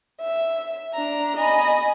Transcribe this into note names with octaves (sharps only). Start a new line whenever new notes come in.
E5
D4 A#5
D#5 G#5 B5